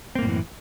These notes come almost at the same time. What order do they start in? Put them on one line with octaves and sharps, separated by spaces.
C4 A#3 A2 F#2 E3